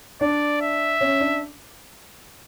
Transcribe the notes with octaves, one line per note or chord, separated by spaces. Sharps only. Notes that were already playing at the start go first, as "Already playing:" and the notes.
D4 D5
E5
C#4
D4